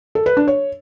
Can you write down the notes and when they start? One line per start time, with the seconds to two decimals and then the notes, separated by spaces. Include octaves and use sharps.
0.15 A4
0.26 B4
0.37 D4
0.48 C#5